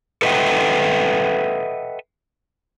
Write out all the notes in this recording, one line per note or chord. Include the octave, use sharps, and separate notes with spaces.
A4 B4 D#5 E5 F#5 G5